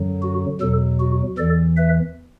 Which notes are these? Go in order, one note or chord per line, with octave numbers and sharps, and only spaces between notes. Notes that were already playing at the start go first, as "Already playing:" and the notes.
Already playing: F#2 D3 F#3
F#4
E2 B2 F#3 A4
F#4
E2 E3 A4 D5
B4 E5